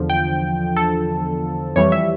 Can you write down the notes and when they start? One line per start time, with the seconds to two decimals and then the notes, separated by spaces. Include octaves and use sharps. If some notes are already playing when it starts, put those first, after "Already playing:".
Already playing: E2 D3 F3
0.10 G5
0.76 A4
1.76 F2 E3 G3 C#5
1.92 E5